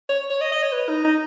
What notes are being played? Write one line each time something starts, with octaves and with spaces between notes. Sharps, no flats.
C#5
C#5
D#5
D#5
C#5
B4
D#4
D#4